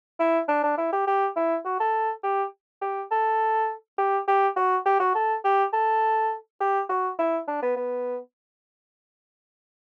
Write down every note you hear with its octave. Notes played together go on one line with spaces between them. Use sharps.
E4
D4
D4
E4
G4
G4
E4
F#4
A4
G4
G4
A4
G4
G4
F#4
G4
F#4
A4
G4
A4
G4
F#4
E4
D4
B3
B3